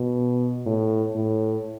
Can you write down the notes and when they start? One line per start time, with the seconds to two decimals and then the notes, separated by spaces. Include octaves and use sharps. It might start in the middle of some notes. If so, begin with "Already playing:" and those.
Already playing: B2
0.66 A2
1.15 A2